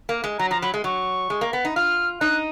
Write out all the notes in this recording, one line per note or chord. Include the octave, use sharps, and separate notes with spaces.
A#3
G#3
F#3 A#5
F3 A#5
F#3 B5
G#3
F#3 C#6
G#3
A#3
B3
D#4
F4 F6
D#4 F#6